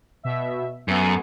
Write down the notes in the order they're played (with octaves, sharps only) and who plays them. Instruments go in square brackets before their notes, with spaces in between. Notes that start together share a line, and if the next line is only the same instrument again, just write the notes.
[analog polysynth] B2 E5
[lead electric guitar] F#2 [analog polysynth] A3 B3